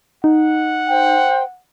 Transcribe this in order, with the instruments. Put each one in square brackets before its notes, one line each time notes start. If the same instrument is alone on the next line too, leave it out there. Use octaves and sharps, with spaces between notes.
[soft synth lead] D#4 [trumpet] F#5
[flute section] C5 G5